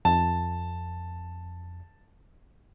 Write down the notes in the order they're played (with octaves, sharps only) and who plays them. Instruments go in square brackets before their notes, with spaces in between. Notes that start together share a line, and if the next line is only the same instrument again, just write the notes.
[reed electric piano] F2 [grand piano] A5